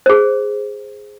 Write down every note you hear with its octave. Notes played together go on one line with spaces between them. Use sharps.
G#4 C5